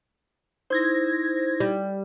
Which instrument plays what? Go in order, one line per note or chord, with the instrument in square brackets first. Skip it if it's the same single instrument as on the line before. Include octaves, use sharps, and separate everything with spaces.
[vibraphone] D#4 E4 [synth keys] C5 G#6 A#6
[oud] G3